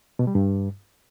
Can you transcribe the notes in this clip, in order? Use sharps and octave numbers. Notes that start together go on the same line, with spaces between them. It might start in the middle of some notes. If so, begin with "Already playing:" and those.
B2
G3
G2